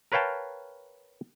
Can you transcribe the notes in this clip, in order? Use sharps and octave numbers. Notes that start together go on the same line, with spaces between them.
A#4 B4 C#5 F5 G5 A5